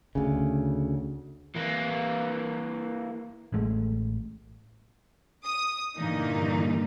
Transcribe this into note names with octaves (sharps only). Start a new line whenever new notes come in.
D2 C#3
E3 A#3
A1 G#3 A3
D#6
G2 A#2 D3 E3 A#3 D#4